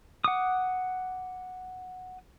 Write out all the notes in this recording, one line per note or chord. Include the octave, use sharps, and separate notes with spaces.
F#5 D6 D#6